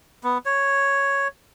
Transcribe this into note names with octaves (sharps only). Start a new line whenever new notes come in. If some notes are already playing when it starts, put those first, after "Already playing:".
B3
C#5